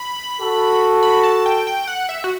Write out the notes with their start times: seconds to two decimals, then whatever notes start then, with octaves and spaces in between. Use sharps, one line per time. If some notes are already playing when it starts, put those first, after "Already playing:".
Already playing: B5
0.39 F#4 A4
1.03 B5
1.23 A5
1.46 G5
1.67 G5
1.87 F#5
2.09 E5
2.24 F#4